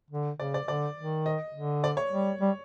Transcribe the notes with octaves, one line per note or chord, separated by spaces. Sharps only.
D3
C#3 D5
D5
D3 D5
D#3
D#5
D3
D5
C#5
G3
G3